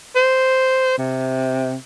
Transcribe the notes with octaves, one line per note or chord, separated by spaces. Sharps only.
C5
C3